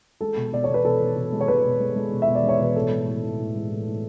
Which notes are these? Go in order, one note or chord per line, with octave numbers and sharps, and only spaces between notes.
G#3 A4
B2
B2 D5
B2 C#5
B4
B2 A4
B2
B2
G#3
C#5
G#3 B4
B2
G#3
G#3
B2
E5
B2
D5
G#3
C#5
B2 B4
A2 A4
G#3
A2
A2
A2
G#3
A2
A2